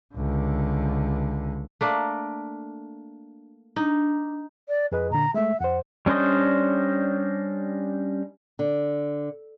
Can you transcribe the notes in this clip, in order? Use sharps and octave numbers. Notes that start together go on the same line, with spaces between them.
C#2 D3
A3 A#3 D4
D4 D#4
D5
F2 G#4 B4 D#5
A#2 D3 A#5
G#3 A3 E5
F2 C5 F#5
G3 C#4 D4 C5 D#5
D3